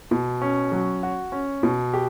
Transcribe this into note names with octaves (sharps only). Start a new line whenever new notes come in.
B2
C#4
F#3
F#4
C#4
B2
G4